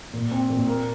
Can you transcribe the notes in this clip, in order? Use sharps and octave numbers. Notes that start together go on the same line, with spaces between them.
A#2
C4
A#2
A#3